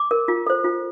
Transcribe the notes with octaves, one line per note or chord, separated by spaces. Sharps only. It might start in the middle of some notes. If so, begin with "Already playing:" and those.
Already playing: D6
A#4
F4
A4 C5
F4